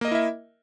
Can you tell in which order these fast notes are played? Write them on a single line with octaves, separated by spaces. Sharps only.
A#3 D#5 A#4 E4 E5